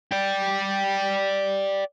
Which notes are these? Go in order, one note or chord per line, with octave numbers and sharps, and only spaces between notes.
D5 G5